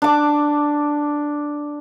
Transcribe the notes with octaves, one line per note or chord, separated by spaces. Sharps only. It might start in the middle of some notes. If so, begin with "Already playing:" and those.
D4 D6